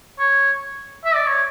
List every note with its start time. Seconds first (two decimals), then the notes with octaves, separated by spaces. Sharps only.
0.19 C#5
1.05 E5
1.15 D5
1.27 C#5